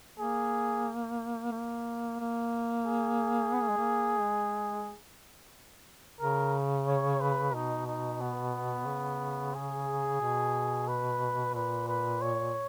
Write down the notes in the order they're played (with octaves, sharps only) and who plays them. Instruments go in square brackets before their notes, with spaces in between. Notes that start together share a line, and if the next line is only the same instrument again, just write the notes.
[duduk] A#3 [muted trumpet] G#4
[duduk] A#3
A#3
[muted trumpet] G#4
[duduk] B3
A#3
G#3
A#3
G#3
[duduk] C#3 [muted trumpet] A#4
[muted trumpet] C#5
B4
[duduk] B2 [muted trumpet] D#4
[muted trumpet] D#4
B3
[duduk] C#3
[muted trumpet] G#4
[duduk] B2
[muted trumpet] B4
[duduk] A#2 [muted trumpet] B4
[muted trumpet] B4
C#5